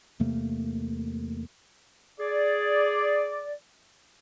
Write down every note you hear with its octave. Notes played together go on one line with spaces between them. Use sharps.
E2 C3 A3 A#3
G#4 D5